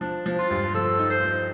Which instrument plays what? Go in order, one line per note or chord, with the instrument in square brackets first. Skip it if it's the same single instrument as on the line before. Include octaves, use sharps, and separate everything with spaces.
[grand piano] F3 [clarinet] D4
[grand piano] F3
[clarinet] F4
[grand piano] G2
[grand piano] F3 [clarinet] A4
[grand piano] D#4
[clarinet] C5
[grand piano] F3